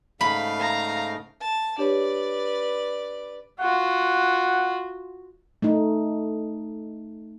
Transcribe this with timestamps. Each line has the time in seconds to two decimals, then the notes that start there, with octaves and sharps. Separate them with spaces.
0.21 G#2 C#3 A3 F5 B5
0.60 A#5
1.40 A5
1.78 D4 G4 B4 C#5 D5
3.59 F4 F#4 F#5
5.62 A3 D#4